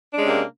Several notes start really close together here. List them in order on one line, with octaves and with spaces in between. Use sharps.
D4 G#3 C#4 C3 A#3